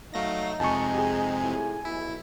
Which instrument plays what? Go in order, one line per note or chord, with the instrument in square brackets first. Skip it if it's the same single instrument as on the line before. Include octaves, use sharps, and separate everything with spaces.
[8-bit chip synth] F#3 A3 A#6 [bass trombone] D#4 [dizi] F5
[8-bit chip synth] F2 C3 G#3 [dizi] G#5 [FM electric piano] A5 C#6
[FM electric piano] G4 G#4
[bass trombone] A2
[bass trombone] B1 [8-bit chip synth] E4